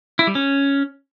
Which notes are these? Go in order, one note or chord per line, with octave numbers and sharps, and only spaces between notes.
E4
G3
C#4